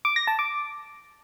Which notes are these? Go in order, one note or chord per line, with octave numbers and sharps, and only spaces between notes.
D6
A#6
A5
D6